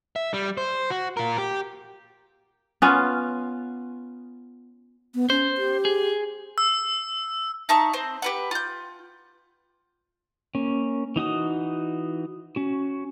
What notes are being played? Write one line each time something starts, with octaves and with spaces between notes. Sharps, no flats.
E5
G3
C5
F#4
F4 A#4
G4
B3 C#4 F4
B3
C#4 C5
G4
G#4
E6
D#4 E5 A5 C#6
C4 C5
G4 B4 F#5
F4 G6
A#3 C#4
E3 D#4 F#4 D#6
C#4 F#4